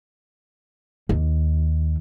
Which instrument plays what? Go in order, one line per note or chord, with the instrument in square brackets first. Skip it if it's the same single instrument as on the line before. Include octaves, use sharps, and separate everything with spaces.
[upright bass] D#2